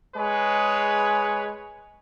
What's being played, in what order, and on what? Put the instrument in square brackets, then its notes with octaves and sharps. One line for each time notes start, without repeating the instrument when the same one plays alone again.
[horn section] G#3 G#4 B4 C#5